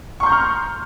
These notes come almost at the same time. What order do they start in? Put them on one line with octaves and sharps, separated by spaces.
C#6 C6 G6 A#5 F6